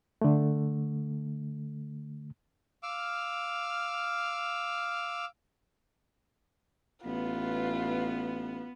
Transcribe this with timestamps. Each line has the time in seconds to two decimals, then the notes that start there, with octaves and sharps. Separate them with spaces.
0.21 D3 A3
2.83 F5 D6 E6 F6
7.05 A1 B3 F4 B4